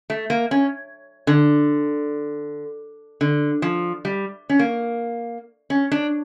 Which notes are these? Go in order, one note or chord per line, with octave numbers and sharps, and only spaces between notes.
A3
A#3
C#4
D3
D3
F3
G3
C#4
A#3
C#4
D4